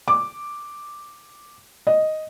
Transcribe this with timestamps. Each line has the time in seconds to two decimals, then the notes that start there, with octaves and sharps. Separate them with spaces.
0.08 D6
1.87 D#5